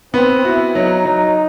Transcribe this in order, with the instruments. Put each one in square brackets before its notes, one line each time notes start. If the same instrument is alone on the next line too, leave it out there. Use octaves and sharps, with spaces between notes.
[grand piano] B3 [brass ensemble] C4
[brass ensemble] E4 [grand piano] F#4
[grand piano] F#3 [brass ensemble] D#4
[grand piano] F#3